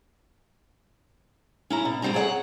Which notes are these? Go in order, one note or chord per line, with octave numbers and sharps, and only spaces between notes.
C#4 E4 A#5
B2
B2 F#3 G3 C4 A#5
G#4 C#5 D#5 F#5